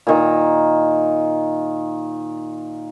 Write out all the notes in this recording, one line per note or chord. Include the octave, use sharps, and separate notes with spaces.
A#2 D#3